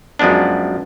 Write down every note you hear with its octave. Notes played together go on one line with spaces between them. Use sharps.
F#2 F3 G#3 B3 D4